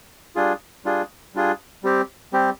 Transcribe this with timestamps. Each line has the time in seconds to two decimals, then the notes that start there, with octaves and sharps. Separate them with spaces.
0.36 G3 D4 F4 G#4
0.85 G3 D4 F4 G#4
1.34 G3 D4 F4 G#4
1.83 G3 C4 G4
2.33 G3 C4 G4